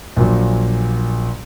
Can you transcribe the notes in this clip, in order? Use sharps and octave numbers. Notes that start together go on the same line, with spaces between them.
A#1 A#2 F#3